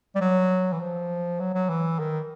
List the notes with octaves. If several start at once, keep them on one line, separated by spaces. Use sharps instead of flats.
G3
F#3
E3
F3
F#3
F#3
E3
D#3